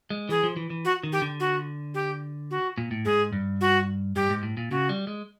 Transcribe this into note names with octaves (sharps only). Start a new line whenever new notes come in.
G#3
E3 G#4
F3
E3
E3
F#4
D#3
G4
D3
F#4
G4
F#4
A#2
A2
G#2 G#4
G2
F#4
G2 G4
G#2
A2
A#2
C#3 F#4
G3
G#3